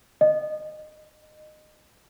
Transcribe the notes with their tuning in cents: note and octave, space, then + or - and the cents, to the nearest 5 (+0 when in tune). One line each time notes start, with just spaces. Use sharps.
D#5 -25